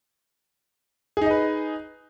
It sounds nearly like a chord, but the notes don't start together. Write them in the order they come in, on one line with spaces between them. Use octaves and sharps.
G#4 D#4 D#5 B4